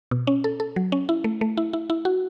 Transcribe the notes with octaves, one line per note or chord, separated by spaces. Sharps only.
B2
C#4
A4
A4
F#3
C#4
E4
A3
A3
E4
E4
E4
F#4